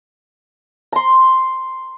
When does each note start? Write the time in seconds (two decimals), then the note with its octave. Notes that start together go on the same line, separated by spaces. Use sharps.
0.92 A#5 C6